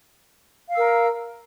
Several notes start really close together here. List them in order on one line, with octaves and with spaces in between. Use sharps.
F5 E6 A#4 A#5